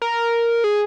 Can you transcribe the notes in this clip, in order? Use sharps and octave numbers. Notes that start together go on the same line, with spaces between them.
A#4
G#4